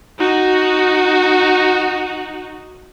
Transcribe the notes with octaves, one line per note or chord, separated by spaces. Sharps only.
D#4 F#4